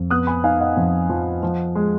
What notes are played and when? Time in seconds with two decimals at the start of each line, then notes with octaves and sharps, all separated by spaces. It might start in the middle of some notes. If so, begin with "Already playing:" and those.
Already playing: F2
0.11 B3 D#6 F#6
0.27 G#5 B5
0.44 D#4 F5 G#5
0.60 D#5 F#5
0.77 F2
1.10 F3
1.43 F3
1.75 G#3